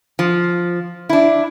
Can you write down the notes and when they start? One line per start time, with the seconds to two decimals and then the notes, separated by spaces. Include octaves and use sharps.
0.19 F3
1.09 D4 E4